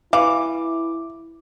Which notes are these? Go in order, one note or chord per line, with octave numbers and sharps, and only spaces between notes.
E3 E4 F5 D6